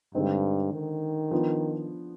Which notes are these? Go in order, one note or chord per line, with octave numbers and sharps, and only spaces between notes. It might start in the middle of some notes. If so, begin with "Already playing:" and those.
G2 D3 G#3 C4 D#4
D#3
F3 B3 D4